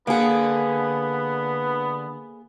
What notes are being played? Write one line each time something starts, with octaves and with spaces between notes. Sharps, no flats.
D3 A#3 B3 G#4 B4 F#5